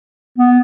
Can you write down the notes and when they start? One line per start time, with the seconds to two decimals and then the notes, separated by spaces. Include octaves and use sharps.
0.38 B3